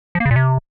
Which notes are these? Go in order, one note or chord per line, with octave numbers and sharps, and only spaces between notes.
F3
A#3
C#3
A#2
C3